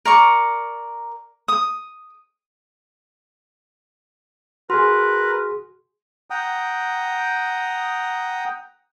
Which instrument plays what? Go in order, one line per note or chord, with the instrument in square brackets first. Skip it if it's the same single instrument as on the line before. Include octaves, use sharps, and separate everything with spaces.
[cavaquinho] A#4 D5 C#6
D#6
[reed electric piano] F#4 G#4 [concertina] A#4 B4 [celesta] C6
[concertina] F#5 G5 A#5 D#6